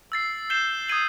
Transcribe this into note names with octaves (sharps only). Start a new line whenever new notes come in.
E6 A6 C7
G6 C7 E7 G7
D#6 G#6 C7 D#7 F#7